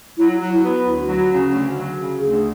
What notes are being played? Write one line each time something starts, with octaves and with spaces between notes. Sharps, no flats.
F#3 E4
F#3
E4
B3
D2 F#4
F#3
C#3
D2
F#3
C#3
D2 G#4